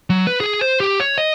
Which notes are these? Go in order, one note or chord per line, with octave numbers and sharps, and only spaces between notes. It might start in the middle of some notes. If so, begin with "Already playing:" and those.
F#3
B4
G#4
C5
G4
C#5
D#5